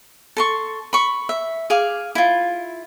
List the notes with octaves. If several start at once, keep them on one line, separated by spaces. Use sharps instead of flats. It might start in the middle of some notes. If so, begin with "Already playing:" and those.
A4 C6 C#6
B5 C#6
E5
G#4 F5 D6
E4 F4